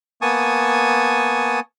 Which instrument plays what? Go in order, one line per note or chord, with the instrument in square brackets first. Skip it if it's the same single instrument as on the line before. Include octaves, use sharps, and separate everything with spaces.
[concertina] A#3 B3 G#5 A5 C#6 D#6